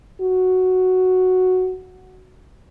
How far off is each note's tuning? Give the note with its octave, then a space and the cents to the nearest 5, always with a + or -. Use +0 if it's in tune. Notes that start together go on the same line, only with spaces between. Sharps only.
F#4 +0